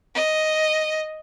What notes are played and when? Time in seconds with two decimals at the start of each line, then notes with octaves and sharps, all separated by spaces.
0.15 D#5